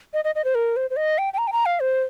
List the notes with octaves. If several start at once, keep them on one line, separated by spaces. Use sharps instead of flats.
D#5
D#5
D#5
C5
A#4
C5
C5
D#5
G5
G5
A#5
G5
A#5
F5
C5